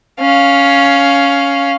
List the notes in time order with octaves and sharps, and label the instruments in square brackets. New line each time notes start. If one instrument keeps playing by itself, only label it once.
[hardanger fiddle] C#4 F5